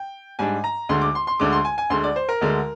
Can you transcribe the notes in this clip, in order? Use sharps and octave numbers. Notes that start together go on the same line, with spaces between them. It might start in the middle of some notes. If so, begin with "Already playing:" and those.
Already playing: G5
G#2 G3 D4 G#5
A#5
D2 D3 G#3 C6
D6
C6
C6
D2 D3 G#3 D6
C6
G#5
G#5
D2 D3 G#3 C6
D5
C5
A#4
D2 D3 G#3